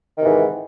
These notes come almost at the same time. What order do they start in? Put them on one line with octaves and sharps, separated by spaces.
D#3 C3 E3 G#2